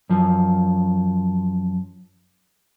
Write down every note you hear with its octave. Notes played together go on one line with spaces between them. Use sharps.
F#2 F3